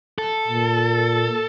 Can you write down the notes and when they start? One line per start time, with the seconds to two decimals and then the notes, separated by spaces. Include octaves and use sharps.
0.18 A4
0.48 A#2